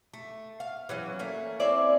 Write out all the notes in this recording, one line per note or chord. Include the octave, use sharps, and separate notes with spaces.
A3
F5
E3 F#3 C#4
A3 A#3 C#4
C4 C#4 E4 D5